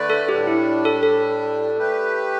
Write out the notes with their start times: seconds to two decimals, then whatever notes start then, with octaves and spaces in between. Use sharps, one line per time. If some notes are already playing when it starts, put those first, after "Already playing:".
Already playing: D3 A3 B4 D5
0.10 A4
0.28 A2 G3 D4 G4
0.47 E4
0.85 A4
1.03 A4
1.78 A3 G4 B4